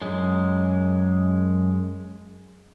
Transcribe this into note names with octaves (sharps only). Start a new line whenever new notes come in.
F#2 G#3